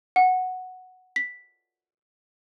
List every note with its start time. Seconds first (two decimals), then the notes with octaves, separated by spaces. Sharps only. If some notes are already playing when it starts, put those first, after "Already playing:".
0.16 F#5
1.16 B6